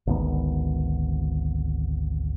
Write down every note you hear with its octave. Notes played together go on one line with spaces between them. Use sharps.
G#1 D2 D#3 B3